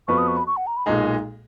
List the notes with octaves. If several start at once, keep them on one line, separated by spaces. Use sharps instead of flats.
F2 F3 B3 F#4 B4 C#6
D#6
C#6
B5
C#6
F#5
A#5
B5
B1 A#2 G#3 D#4 G#4